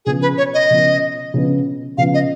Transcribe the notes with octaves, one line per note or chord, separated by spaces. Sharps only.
C#3 F3 B3 G#4
B4
C#5
D#5
C#3 F3 B3
C#3 F3 B3
C#3 F3 B3 F5
D#5